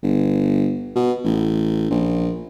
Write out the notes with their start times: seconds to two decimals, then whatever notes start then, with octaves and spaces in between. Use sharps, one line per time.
0.03 G1
0.95 B2
1.24 A1
1.90 A#1